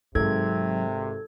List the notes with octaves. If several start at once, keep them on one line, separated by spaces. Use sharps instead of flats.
G#1 C3 F#3 G#3 A4 G#6